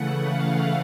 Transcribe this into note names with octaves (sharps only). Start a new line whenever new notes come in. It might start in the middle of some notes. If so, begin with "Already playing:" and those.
Already playing: C#3 E3 A3 F#5
F5